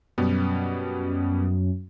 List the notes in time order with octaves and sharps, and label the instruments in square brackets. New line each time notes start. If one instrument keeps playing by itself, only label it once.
[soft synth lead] F#2 [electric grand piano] B2 G3 B3